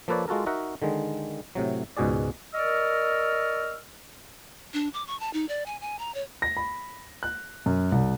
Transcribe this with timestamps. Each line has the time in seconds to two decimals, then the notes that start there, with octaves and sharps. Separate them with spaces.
0.08 F3 A#3 A4 B4 C#5 D5
0.28 G#3 F4 F#4 A4 A#4
0.46 D#4 F#4 A#4 E5 F#5
0.82 D3 D#3 G#3
1.55 A2 C3 F#3
1.97 C#2 G#2 B2 F#4 G#4 D5
2.54 A#4 D5 D#5 C#6 E6 F6
4.74 D4
4.94 D6
5.07 C#6
5.20 A5
5.34 D#4
5.49 D5
5.66 G#5
5.81 G#5
5.99 A#5
6.14 C#5
6.42 A#6
6.57 B5
7.23 F#6
7.66 F#2
7.92 C2